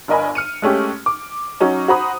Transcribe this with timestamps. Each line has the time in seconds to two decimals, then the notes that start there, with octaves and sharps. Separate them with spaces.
0.08 G1 D4 A#4 D#5 G#5 B5
0.35 F6 C#7 D#7
0.62 G#3 A3 C#4 G4
1.06 D6
1.60 F#3 C#4 D#4
1.88 F#4 C5 A#5 B5 D#6